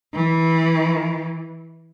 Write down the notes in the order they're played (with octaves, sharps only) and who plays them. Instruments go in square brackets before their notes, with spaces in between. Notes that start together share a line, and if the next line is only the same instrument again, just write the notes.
[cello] E3